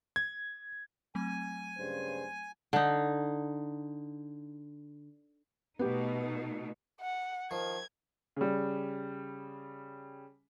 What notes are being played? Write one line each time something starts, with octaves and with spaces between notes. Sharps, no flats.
G#6
F#3 A3 C4 G#5
G2 C#3 C5
D3 D#4
B2 A3 B3 D#4 G4
F#5
D#3 F3 G#6
C#3 G3